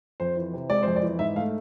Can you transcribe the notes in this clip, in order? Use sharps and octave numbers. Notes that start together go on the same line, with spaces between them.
F2 C5
E3
C3
G#3 D5
F2 C5
D5
E3
G#2 E5
A3 F5